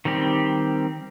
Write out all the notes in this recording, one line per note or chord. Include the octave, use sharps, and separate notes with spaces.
D#3 G3 C4 G4